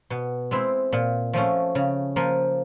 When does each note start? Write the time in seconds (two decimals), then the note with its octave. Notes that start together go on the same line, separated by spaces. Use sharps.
0.10 B2
0.51 G#3 C4 E4
0.93 A#2
1.33 F3 A3 C#4
1.75 C#3
2.16 F3 A#3